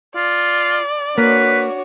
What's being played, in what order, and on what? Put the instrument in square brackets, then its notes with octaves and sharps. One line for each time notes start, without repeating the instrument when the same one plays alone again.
[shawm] F4 [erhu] D5
[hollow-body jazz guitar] A#3 [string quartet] D4 F#4 C#5 [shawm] B4